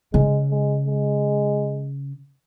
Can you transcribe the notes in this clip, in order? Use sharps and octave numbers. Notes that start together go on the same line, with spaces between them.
C#3 G#3
G#3
G#3